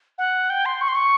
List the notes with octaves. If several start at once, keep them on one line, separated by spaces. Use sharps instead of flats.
F#5
G5
C6
C#6
C6
C#6